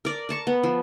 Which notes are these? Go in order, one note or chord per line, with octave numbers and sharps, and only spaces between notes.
A#4 D5
A#4 A5 C#6
B3
F3